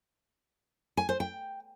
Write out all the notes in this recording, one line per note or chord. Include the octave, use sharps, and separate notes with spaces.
G#5
C5
G5